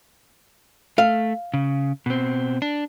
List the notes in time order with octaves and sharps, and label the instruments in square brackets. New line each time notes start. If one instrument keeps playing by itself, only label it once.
[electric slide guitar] A3 [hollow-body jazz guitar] F5
[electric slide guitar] C#3
B2 C4
D4